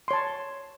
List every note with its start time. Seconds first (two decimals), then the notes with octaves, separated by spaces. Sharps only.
0.08 C6
0.11 C#5
0.13 A5